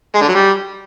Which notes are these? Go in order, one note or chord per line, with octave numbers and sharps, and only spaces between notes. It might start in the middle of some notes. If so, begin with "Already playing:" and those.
G#3
D3
F#3
G3